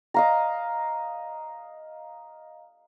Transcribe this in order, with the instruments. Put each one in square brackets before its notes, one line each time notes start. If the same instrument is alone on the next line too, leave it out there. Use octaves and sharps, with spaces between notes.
[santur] D#5 F5 A#5